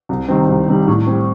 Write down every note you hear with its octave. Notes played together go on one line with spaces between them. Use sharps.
C2
C3 D#3 G3 C4
C2
C3 D#3 G3 C4
A2
G3 C4